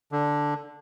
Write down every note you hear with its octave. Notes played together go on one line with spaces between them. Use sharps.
D3